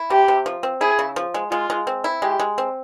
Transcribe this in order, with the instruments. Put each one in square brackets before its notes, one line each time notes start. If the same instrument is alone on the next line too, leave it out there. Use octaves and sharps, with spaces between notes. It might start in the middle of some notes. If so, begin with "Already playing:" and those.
Already playing: [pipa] E4
[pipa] C3 [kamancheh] G4
[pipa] C3
F3
C4
[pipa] E4 [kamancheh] G#4
[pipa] C#3
F3
G#3
[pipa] G#3 [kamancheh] F4
[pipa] G#3
C4
E4
[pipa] G#3 [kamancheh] G4
[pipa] G#3
C4